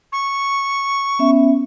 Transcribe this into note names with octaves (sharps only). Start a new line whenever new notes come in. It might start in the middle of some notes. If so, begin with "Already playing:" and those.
C#6
B3 C#4 E5